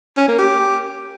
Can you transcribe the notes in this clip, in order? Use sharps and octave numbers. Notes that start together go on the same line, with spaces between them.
C#4
A#3
G4